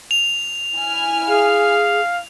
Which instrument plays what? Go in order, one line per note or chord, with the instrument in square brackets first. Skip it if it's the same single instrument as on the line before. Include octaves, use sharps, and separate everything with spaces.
[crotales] F7
[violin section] E4 G#5 F6
[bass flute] G#4 [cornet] F5